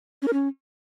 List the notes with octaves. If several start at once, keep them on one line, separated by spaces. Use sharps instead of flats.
C#4
A#4
C#4